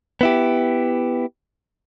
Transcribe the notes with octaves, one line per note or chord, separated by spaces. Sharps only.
B3 E4 G4